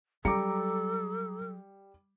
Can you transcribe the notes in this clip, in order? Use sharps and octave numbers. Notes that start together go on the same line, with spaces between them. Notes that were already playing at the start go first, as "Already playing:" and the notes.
F#3 G3 A4 A#5 D6 C#7